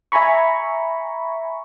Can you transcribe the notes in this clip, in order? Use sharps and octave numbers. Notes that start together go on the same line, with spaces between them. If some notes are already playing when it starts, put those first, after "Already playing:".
E5 G#5 A#5 B5 C#6